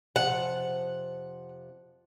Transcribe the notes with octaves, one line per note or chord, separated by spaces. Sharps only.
F2 C3 F3 F#5